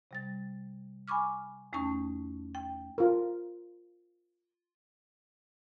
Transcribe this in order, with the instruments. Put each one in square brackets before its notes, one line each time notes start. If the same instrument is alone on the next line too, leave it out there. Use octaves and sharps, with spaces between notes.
[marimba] C3 G3 A6
G#5 B5 C#6 D6 F6
E2 A3 C#4 D#4 A5 C#6
G5
[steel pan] F4 A#4